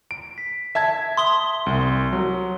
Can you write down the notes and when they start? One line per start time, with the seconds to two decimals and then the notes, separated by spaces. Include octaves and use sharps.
0.11 D7
0.38 B6
0.75 E5 A5 G#6
1.17 C6 D#6 G7
1.66 C2
2.13 F#3